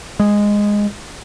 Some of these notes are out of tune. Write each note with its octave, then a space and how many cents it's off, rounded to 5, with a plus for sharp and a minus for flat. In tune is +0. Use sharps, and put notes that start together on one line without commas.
G#3 -10